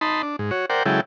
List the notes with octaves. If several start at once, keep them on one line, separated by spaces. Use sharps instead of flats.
D#4 A5 B5 C6
D4
G#2
F#4 C#5
A#4 C5 D5 F#5 G5
C#3 F#3 G#3 E4 A4 G5